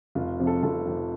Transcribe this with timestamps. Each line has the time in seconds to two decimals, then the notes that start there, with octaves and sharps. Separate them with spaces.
0.15 F1 F4
0.39 F2 C3 F3
0.47 A4
0.63 F1 A4
0.87 F2 C3 F3